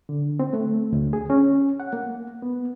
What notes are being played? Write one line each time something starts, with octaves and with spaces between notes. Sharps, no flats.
D3
C4
A3
D2
G#4
C#4
F#5
A#3
B3